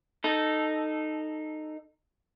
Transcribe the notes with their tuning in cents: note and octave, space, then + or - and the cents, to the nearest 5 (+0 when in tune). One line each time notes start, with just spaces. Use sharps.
D#4 -10 A4 +0